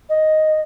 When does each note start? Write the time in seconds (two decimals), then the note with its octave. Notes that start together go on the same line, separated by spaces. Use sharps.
0.09 D#5